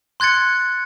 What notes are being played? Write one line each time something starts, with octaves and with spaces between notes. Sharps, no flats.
C6 F#6 G#6 A6 C#7